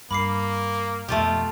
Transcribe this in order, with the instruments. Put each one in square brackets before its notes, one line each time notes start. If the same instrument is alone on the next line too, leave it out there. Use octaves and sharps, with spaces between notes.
[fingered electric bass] G2 [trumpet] A#3 [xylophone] B5 D6 C7
[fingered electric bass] F2 B2 [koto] A3 F4 G4